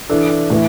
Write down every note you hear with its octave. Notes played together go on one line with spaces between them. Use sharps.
E3 D4 A4
A2 E3